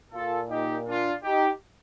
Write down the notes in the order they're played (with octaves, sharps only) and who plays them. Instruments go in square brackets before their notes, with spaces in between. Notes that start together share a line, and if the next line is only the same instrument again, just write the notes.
[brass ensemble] A#2 F4 A4
D#4 G4
D4 F4
D#4 G4